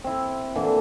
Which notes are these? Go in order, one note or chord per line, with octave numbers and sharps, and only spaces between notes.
C4 E4
A#2 D3 E3